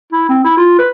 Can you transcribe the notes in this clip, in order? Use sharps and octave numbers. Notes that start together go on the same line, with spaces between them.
E4
C4
E4
F4
B4